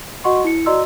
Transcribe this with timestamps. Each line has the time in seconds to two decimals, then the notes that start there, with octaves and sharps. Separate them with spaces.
0.24 F#4 D#5 F#5 C6 C#6
0.44 E4 C#7
0.66 F#4 D5 D#5 A#5 C6 E6